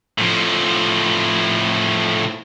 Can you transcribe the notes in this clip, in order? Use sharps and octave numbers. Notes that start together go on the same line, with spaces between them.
A2 F3